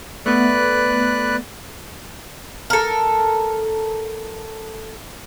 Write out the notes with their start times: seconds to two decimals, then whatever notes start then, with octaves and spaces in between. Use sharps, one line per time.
0.26 A3 B3 B4 D5 F#6
2.70 A4 A#4